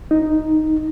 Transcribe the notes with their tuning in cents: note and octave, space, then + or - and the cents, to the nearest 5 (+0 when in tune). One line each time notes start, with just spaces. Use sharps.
D#4 +0